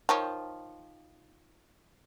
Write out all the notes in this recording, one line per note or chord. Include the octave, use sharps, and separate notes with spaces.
D#3 F3 C#5